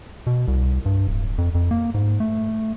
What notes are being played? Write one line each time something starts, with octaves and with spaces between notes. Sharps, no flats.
B2
C2
G2
D1
F2
F2
A#3
G#2
A3